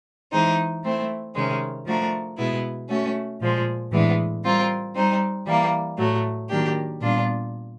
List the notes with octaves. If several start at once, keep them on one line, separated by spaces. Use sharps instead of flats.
E3 G#3 C4 D#4
A3 C4 E4
C3 D#3 G#3 C#4
F3 A3 D4 F#4 A#4
B2 G#3 B3 E4
A3 C#4 F#4
A#2 F3 G#3
A2 E3 G#3 B3 D4
G3 C4 F4 A#4
G3 C4 D#4
E3 G3 A#3
A2 F#3 A3
D#3 F#3 A#3 D4 G4
A#2 G3 B3 D4 F4